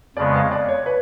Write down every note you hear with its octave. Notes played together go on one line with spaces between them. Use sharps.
F2 C#3 G#3 B3 D5
F5
D5
C#5
B4